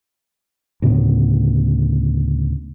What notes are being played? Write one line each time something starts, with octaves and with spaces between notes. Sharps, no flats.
D2 A2 C#3 B3